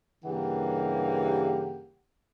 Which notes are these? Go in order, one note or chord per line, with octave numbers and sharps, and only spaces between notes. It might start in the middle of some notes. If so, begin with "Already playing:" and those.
G2 C#3 E3 A#3 G4 F#5